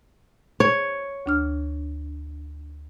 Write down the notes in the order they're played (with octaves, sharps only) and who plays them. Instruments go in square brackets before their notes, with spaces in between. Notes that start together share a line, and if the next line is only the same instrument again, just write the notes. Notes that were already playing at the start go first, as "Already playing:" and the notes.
[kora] C#5
[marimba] D2 D4 F6